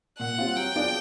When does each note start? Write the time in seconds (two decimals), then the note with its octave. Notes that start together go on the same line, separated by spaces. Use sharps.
0.19 A#2 F#5
0.38 G3 C4 F4
0.56 F#3 G5
0.76 B3 D4 F4 G#4